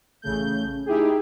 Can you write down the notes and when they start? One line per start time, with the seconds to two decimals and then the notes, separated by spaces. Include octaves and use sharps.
0.22 A1 C#3 A3 G6
0.86 D#4 E4 G4 G#4